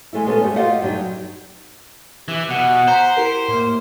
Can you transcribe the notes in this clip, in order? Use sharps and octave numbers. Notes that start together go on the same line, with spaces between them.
G#3 A3 E4
G#3 B3 C#4 A4
G2 G3 A3
F4 G4 D#5 F5 F#5
G2 F#3 D#4
E3 G4
B2 F#5
C5 A#5 B6
E4 G4 A#4
A2 A#3 C6